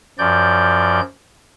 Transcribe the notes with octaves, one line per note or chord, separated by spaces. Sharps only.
F#2 F3 D5 G6